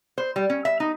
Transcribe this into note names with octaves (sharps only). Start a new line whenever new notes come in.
C5
G3
C#4
E5
D#4